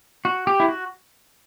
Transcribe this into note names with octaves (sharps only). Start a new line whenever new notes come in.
F#4
G4
E4
F#4